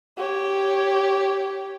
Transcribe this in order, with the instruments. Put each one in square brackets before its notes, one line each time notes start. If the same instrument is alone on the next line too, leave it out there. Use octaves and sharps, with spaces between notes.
[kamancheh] G4 C#5